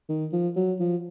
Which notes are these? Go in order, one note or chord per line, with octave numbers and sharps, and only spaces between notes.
D#3
F3
F#3
F3